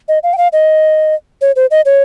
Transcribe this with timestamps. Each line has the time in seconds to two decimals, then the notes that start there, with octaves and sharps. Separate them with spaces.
0.08 D#5
0.23 F5
0.33 G5
0.38 F5
0.53 D#5
1.41 C#5
1.56 C5
1.71 D#5
1.85 C#5